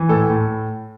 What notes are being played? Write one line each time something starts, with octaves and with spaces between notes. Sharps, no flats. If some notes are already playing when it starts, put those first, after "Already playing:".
Already playing: E3
A2 A4
A2